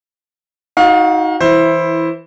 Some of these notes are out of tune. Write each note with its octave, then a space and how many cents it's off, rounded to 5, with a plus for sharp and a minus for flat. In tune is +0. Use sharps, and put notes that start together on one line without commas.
D#4 +25 F#4 +0 F5 +30
E3 -10 E4 +0 C5 +15